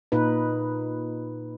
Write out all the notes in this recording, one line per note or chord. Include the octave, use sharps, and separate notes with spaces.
A#2 D#4 B4